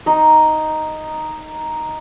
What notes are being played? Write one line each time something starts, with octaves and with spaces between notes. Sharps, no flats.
D#4 D#5